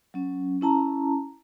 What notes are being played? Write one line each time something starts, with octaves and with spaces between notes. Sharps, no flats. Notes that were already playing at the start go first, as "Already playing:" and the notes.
F#3 C#4
C#4 E4 A5 A#5